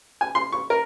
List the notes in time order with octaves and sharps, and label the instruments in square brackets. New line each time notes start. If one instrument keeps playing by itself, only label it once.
[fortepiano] G#5
C6
C#6
A#4